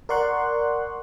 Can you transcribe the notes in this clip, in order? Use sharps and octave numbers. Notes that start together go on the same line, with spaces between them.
A#4 D5 F#5 C6 C#6 F#6